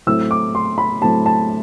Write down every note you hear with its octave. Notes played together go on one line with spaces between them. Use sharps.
A2 F#3 A3 C4 E4 E6
D6
C6
B5
A2 F#3 A3 C4 E4 A5
A5